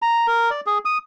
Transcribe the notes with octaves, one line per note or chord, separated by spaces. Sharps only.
A#5
A#4
D5
G#4
D#6